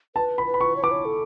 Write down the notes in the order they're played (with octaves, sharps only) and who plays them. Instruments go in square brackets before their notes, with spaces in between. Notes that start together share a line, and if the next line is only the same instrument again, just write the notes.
[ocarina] B4 [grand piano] A5
[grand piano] B5
[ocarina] B4
[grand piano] B5
C#6
[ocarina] C#5
[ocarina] B4 [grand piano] D6
[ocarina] C#5
A4